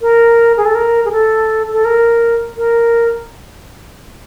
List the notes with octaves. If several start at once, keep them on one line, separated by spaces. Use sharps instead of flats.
A#4
G#4
A4
A#4
G#4
A4
A4
A#4
A#4